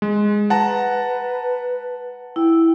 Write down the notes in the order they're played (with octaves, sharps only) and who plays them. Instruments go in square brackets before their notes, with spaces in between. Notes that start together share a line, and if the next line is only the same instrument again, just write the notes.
[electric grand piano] G#3
[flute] B4 [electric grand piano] F#5 A5 A#5
[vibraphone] E4 [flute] G5